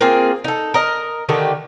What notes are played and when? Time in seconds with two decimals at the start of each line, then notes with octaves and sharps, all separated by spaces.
0.01 A#3 C4 F4 G#4
0.44 D#4 A4
0.74 A#4 D#5
1.29 D3 D#3 A3 G4